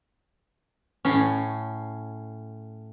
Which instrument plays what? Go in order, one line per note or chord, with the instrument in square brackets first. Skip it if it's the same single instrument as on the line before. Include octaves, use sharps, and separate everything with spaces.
[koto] A2 C#4